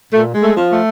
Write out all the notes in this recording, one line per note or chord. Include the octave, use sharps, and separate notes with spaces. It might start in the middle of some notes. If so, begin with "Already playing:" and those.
A#2 A3
G#3
A3
F3
A3